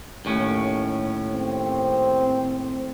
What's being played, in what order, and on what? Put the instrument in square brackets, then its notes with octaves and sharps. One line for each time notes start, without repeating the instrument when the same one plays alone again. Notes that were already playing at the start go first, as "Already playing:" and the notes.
[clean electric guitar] D#2 A2 C#4
[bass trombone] C4